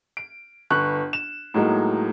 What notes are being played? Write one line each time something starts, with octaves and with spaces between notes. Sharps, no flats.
D7
G1 B4 C#6 F#6
E7
A2 F#3 G#3 A#3 D#4